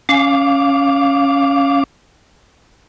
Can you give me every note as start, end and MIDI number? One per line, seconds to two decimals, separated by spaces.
0.09 1.83 61
0.09 1.83 77
0.09 1.83 86